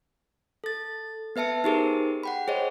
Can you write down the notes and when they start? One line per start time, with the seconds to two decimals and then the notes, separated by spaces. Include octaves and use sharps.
0.64 A4 A6
1.36 B3 B4 E5 A5 C#7
1.64 D#4 G4 G#4 A#4 C5
2.23 F#5 G5 B5
2.48 G#4 C5 C#5 D#5